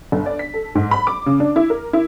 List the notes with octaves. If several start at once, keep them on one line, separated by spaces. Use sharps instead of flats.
G1
D5
B6
A4
G#2
B5
D6
C#3
D4
E4
A#4
E4